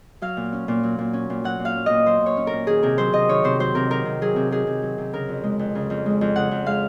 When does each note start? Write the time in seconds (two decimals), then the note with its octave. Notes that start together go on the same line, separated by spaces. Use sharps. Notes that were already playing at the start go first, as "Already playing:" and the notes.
0.22 F#3 F5
0.37 A#2
0.52 C#4
0.68 A#2
0.83 F#3
0.98 A#2
1.13 C#4
1.30 A#2
1.44 F#3 F#5
1.59 A#2
1.65 F5
1.75 C#4
1.86 A#2 D#5
2.06 F#3 C5
2.22 A#2 C#5
2.37 C#4
2.47 A#4
2.53 A#2
2.67 D#3 G#4
2.83 C3 A#4
2.98 F#3 C5
3.13 C3 D#5
3.29 D#3 C#5
3.44 C3 C5
3.59 F#3 C5
3.75 C3 A#4
3.90 D#3 A#4
4.05 C3
4.21 F#3 G#4
4.36 C3
4.51 D#3 G#4
4.67 C3
4.82 F#3
4.98 C3
5.13 C#3 A#4
5.28 F2
5.43 G#3
5.59 F2
5.75 C#3
5.90 F2
6.06 G#3
6.21 F2
6.36 C#3 F#5
6.51 F2
6.66 G#3 F5